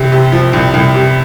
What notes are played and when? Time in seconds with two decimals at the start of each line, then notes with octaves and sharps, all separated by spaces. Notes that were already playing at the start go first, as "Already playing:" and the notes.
Already playing: C2 C3
0.12 C3
0.32 F3
0.53 C2
0.74 C2
0.95 C3